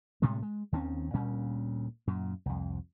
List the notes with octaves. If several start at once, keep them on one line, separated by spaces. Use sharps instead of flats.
A2 C3 G3 G#3
G#3
D#2 D#3 C4 C#4
D2 A#2 G3 C#4
F#2 A#2
C2 F2